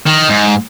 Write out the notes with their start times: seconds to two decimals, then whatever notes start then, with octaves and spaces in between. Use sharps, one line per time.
0.07 D#3
0.30 G#2